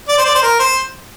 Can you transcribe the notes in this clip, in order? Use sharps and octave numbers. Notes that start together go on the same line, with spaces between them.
D5
C5
D5
C5
A#4
C5